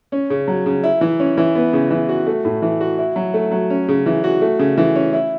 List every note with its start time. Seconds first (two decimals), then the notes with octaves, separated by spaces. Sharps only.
0.12 C#4
0.30 C#3
0.48 F#3
0.66 C#3
0.84 E4
1.01 E3
1.20 C#4
1.38 E3
1.55 B3
1.73 C#3
1.90 E3
2.09 F#4
2.27 A3
2.45 A2
2.62 E3
2.80 F#4
2.98 E4
3.16 F#3
3.34 A3
3.52 F#3
3.70 C#4
3.88 C#3
4.06 E3
4.24 F#4
4.41 A3
4.59 C#3
4.78 E3
4.96 C#4
5.13 E4